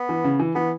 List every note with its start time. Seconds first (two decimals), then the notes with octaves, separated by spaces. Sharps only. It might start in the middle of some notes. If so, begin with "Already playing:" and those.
Already playing: B3
0.09 E3
0.24 C#3
0.39 E3
0.55 E3 B3